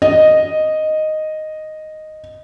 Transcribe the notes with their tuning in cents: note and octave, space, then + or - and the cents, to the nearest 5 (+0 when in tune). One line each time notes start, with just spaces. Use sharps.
D#5 -5